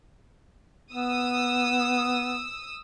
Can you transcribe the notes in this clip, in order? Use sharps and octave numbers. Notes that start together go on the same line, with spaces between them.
B3 D#6 E6